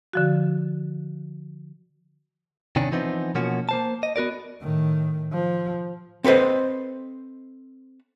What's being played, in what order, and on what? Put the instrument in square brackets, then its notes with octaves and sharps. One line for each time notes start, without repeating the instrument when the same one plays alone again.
[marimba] D3 F3 F#4
[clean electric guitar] C3 D#3 C#4 D4
E3 F3 B3 C4 D#4
B2 F3 A#3 C#4 F#4
A#3 C5 A5
D#5
B3 F#4 A#4 D5
[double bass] A2 D#3
F3
[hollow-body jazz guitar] C4 A4 B4 C5 D#5